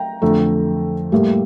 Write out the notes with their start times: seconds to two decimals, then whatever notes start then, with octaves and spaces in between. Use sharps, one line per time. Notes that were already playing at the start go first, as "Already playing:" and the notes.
Already playing: G5 A#5
0.22 F2 D3 A3
1.12 A2 G3 A#3